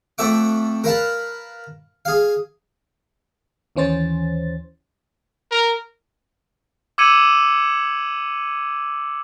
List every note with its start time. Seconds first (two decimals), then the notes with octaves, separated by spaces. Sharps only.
0.18 F2 A3 E5 F#5 D6
0.84 A#4 B4 F5 A5
2.05 G#4 F5
3.76 D#2 E3 C#4 C5 A6
5.51 A#4
6.98 D6 E6 G#6 C#7 D#7 F#7